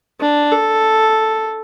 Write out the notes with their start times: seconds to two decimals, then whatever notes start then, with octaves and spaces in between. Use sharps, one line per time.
0.20 D4
0.51 A4